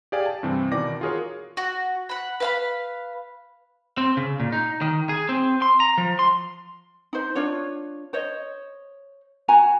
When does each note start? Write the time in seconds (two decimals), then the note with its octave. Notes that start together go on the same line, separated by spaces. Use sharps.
0.12 G4 G#4 D5 F5 G#5
0.26 A5
0.43 G2 C3 E3 C4
0.72 B2 D#3 E3 D5 D6 A#6
1.01 F4 F#4 G#4 A#4 C#5
1.57 F#4
2.09 F#5 B5
2.40 B4 F5 B5
3.98 C4
4.17 C#3
4.40 A#2
4.52 D#4
4.82 D#3
5.09 G#4
5.29 C4
5.62 C6
5.80 A#5
5.98 F3
6.19 C6
7.13 D#4 C5
7.35 D4 F4 C#5
8.13 C5 C#5 D#5
9.48 F#4 G#5 A#5